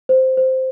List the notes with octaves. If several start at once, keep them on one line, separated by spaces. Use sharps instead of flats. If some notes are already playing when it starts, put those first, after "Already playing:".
C5
C5